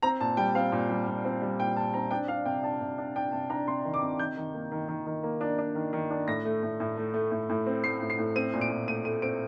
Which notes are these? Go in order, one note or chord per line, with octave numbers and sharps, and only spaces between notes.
C4 A#5
A#2 A5
G3 G5
C4 F5
A#2
G3
A#2
C4
G3
A#2 G5
A#2 A5
C4 A#5
D4 G5
D4 F5
C3 G5
D4 A5
C3
D4
D4 G5
C3 A5
D4 A#5
C3 C6
D#3
D6
C3
D#3 G6
D#3
A#3
D#3
D#3
D#3
A#3
D4
D4
D#3
D#3
D4
A2 A#6
A3
A2
A2
A3
A3
A2
A2
C4
A3 C7
A2
C7
A2
C4 D#7
A#2
D7
A#2
A3 D#7
A3 D#7
C4 D7